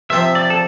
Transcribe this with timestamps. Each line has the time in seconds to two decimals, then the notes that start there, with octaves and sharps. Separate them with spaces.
0.10 C3 F3 C4 F4 C5 E5
0.35 D5
0.50 A4